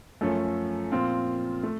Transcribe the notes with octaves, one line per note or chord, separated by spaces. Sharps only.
F#2 F3 A3 C#4 A4
A#2 F3 C4 F4
A3